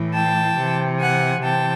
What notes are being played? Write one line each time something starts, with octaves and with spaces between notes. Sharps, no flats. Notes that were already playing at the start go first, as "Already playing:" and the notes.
Already playing: A2 E3
G5 A5
C3 E3
F#5 G#5
C3 E3 G5 A5